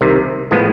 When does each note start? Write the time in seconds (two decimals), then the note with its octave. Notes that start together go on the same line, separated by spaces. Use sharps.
0.01 C2 C3 D#3
0.51 A2 F3 G#3 B3